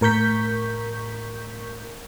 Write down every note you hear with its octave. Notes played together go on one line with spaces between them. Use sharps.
A2 A#4 C#6 G6 B6